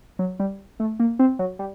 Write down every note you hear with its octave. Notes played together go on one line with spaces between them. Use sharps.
F#3
G3
A3
A#3
C4
F#3
G3